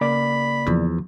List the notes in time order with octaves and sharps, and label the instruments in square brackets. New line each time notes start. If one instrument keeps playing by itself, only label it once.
[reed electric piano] C#3 A#3 D5 [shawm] B5
[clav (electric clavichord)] E2 [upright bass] F3 F4